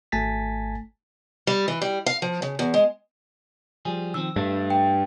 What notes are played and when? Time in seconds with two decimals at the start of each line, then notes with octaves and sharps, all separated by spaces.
0.12 G#1 A3 G#5 A5 A6 B6
1.47 G3
1.68 E3
1.82 G3
2.06 F5
2.22 F3
2.42 C#3
2.59 E2
2.74 G#3
3.85 F3 G3 G#4
4.14 D#3 F3 C4 E6
4.36 G2 A3
4.70 G5